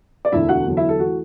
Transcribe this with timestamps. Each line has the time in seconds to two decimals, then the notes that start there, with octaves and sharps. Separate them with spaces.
0.25 D5
0.32 E1 D2 D3 E4 E5
0.49 F#4 F#5
0.66 E2 D3 F#3
0.77 E4 E5
0.89 A4
0.99 E3 A3 F#4